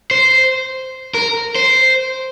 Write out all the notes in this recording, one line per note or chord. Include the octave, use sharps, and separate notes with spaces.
C5
A#4
C5